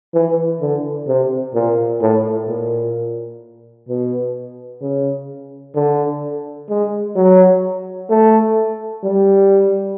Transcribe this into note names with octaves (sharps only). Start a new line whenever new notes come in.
E3
D3
C3
A#2
A2
A#2
B2
C#3
D3
G#3
F#3
A3
G3